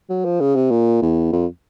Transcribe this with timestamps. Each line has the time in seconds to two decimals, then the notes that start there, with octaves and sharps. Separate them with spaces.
0.10 F#3
0.25 F3
0.40 C#3
0.55 C3
0.71 A#2
1.02 E2
1.32 F2